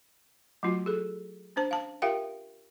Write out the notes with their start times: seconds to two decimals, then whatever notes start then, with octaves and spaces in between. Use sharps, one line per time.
0.63 F#3 A3 C#4 F4 F#4
0.86 G#4 A4
1.56 C#4 D4 C5 A5
1.71 F5 A5
2.02 F4 G4 A#4 E5 F5 G5